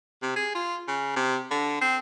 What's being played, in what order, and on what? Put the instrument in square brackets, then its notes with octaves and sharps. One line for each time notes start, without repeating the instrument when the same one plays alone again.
[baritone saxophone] C3
G#4
F4
C#3
C3
D3
C4